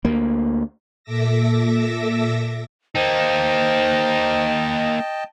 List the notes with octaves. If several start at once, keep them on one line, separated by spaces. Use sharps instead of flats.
D2 A#3
A#2 A4 E5 D6 E6 A#6
A#3 D#4 C5 D#5 G5 A5